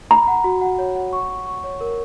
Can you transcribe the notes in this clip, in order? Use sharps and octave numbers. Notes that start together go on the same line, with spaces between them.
A#5 B5
F#5
F#4
F#5
C#5
F#5
C#6
C#6
C#6
C#5
A#4